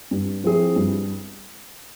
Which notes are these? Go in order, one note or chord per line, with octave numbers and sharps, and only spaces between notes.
G2
F3 C4 E4 G#4
G2